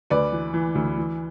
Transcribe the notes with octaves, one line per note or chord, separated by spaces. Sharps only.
D2 B4 D5
E3
E3
D2
E3